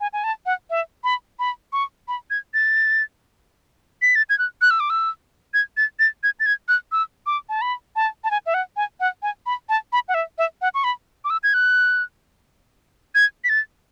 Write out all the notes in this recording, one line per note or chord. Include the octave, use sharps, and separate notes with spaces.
G#5
G#5
A5
F#5
E5
B5
B5
C#6
B5
G#6
A6
B6
A6
G#6
F#6
F#6
E6
D6
E6
G#6
A6
A6
G#6
A6
G#6
F#6
E6
D6
A5
B5
A5
A5
G#5
E5
F#5
G#5
F#5
G#5
B5
A5
B5
F#5
E5
E5
F#5
C#6
B5
D6
E6
G#6
F#6
G#6
B6
A6